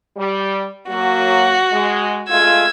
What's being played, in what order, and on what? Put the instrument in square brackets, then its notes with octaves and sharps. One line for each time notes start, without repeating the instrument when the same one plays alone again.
[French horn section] G3
[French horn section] F#3 A#3 [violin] F#4
[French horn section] G#3
[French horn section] G#3 A3 F4 [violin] E6 G#6